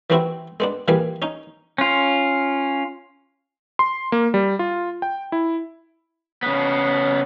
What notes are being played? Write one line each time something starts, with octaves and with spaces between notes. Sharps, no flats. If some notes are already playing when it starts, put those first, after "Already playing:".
E3 F#3 B3 C4 E4 F#4
G#3 B3 D4
A#2 E3 G3 G#4 B4
C#4 D#4
C#4 F4
C6
A#3
G3
F4
G5
E4
C#3 B3